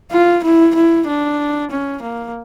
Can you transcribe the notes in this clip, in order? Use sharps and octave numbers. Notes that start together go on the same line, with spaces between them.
F4
E4
E4
D4
C#4
A#3